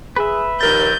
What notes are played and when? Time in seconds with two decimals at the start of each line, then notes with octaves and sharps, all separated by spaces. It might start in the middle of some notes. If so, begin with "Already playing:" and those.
0.16 G#4 B4 E5
0.61 A#1 D#2 A#4 G6 A6